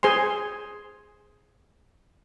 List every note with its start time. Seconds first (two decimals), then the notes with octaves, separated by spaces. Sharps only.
0.03 G#4 C5 G#5 C6